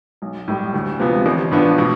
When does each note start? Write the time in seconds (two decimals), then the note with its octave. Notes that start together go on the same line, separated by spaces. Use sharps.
0.22 B1
0.48 A2 G3
0.74 D2
1.00 C3 F3 B3
1.26 A1
1.51 A2 F3 B3 D4
1.78 B2